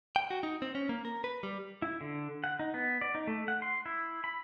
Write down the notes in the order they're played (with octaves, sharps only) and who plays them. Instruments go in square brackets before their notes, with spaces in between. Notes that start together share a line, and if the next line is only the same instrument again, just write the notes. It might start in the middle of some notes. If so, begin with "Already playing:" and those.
[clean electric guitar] G5
F#4
D#4
C4
C#4
A#3
A#4
B4
G3
[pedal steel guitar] E4
D3
F#5
D#4
B3
D5
D#4
A3
F#5
C6
E4
B5